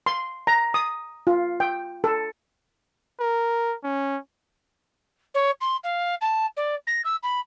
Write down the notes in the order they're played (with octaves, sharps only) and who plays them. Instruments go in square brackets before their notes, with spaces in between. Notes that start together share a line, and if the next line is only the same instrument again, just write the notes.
[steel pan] C6
A#5
D#6
F4
G5
A4
[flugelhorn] A#4
C#4
[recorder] C#5
C6
F5
A5
D5
A#6
E6
B5